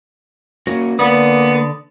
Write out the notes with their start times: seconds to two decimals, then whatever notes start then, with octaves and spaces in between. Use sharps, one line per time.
0.67 A#3 C#4 F#4
0.99 D3 A#3 B3 D5 D#6